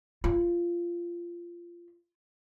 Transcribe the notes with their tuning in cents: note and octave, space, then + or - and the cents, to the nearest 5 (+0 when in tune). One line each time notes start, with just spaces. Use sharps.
F4 -15